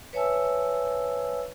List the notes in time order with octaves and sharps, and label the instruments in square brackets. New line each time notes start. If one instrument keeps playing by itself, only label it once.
[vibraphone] B4 C#5 E5 G#5 A5 E6